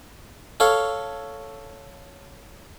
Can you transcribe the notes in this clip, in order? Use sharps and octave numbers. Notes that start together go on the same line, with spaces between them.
A4 C#5 F5